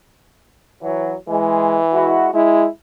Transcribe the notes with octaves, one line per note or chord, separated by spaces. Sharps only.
E3 F#3
E3 G#3
G#3 E4 F#4
G#3 E4